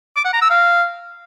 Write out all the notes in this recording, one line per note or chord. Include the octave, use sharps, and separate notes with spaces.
D6
F#5
A#5
E6
F5